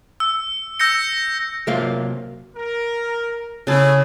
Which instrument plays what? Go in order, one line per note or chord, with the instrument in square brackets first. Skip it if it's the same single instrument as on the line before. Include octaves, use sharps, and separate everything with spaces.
[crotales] E6
E6 G6 A#6 C#7
[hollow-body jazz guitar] C3 F#3 A#3 F4 C5 F5
[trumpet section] A#4
[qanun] C#3 A5 [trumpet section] A3 E4 G#4